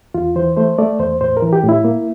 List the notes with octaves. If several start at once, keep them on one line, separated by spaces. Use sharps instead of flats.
E2 F4
E3 C5
A3 C5
A3 D5
E2 C5
A2 C5
A#4
E3
G4
A2
E4
A#3